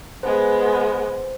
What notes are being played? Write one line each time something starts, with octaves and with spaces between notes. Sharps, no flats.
G#3 B3 C5